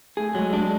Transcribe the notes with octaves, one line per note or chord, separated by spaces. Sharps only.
A3 G#4
F#3 G#3
G#3 D4